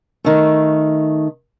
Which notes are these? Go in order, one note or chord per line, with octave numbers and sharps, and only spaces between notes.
D#3 A3